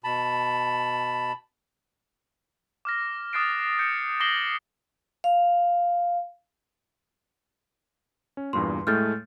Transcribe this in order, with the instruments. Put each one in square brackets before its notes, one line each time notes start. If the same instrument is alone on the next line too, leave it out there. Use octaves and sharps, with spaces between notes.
[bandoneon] B2 A5 B5
[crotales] D6 F6 A#6
D6 D#6 F#6 A6 C7 D7
G6 C#7
D6 D#6 A#6 C7 F#7 G7
[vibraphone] F5
[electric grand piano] C#4
[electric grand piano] E2 G2 A#2 [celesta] C6
[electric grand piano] A2 G#3 A3 [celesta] F6 G6 A6